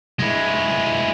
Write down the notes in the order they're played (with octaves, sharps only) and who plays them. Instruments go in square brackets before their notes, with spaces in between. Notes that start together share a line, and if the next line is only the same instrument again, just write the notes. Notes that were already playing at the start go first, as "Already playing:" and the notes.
[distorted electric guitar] G#3 E4